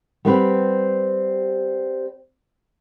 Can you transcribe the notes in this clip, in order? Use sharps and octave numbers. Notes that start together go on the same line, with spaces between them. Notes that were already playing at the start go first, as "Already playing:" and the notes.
G3 B3 C4 G4 B4